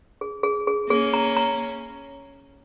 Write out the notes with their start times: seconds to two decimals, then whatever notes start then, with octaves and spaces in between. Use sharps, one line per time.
0.21 G#4
0.43 G#4
0.67 G#4
0.90 A#3 C#4 G#4
1.14 A#5
1.37 A#5